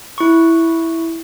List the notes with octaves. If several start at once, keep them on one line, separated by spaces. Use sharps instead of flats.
E4 C#6